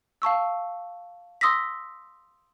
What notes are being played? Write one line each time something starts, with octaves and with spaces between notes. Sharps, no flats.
F5 A5 C#6 E6
C6 D#6 E6 A#6 B6